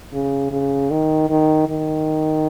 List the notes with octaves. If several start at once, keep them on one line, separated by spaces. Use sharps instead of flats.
C#3
C#3
D#3
D#3
D#3